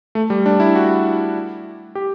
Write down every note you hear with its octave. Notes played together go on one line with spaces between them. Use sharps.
A3
G3
D4
E4
F#4
G4